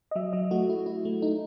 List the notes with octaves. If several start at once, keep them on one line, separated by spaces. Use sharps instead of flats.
D#5
F#3 E5
F#3 D#5
A3 F#4
E4
E4
A3
D#4